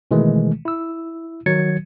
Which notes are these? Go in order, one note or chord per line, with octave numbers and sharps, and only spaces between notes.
B2 D#3 E3 G#3 A3
E4 E6
D#3 F#3 G#6 A6 C#7